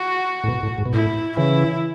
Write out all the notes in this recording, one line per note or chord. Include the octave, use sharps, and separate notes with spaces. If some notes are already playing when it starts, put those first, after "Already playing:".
Already playing: F#4
A2
B2
A2
G#2
B2
A2 E4
C#3 E3 E4